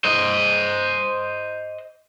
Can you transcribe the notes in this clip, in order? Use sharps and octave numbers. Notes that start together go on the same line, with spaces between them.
C5 D#5